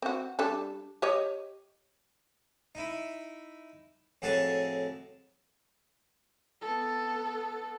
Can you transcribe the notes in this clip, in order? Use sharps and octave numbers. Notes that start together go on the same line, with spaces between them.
C4 F#4
G3 D4 A4
G4 C#5 D#5
D#4 E4
F2 A2 F#4 G#4 C#5 A5
B3 A4